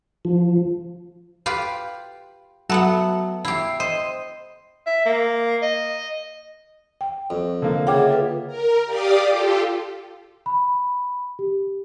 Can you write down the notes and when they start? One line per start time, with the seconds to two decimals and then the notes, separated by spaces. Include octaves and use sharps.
0.25 F3
1.46 F4 G4 B4
2.70 F#3 A3 B3 F#5
3.45 E4 G4 C7
3.80 C5 D#5
4.86 E5
5.05 A#3
5.62 D#5
7.01 G5
7.30 F2
7.62 D3 A#3
7.87 C#3 F4 G#4 E5 F#5 G5 D6
8.09 F4 A4 B4
8.47 A#4
8.85 G4 D5 F5 D6 D#6
9.29 F4 G4 A4
10.46 B5
11.39 G4